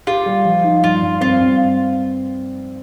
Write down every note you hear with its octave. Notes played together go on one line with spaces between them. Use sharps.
F4 G4
G3
F3
D#4
G2 F4
G2
C4 F4
G2